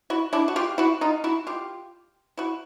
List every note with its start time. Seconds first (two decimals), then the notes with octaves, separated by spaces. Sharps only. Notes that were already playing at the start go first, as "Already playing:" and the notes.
0.10 E4 F#4
0.33 D4 E4
0.48 F#4
0.56 F4 G4
0.78 E4 F#4
1.01 D#4 F4
1.24 E4 F#4
1.47 F4 G4
2.37 E4 F#4